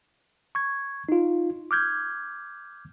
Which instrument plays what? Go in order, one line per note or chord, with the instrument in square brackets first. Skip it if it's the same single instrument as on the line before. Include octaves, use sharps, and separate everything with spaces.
[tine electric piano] C#6 G#6
D#4 F4
D6 F6 G6 G#6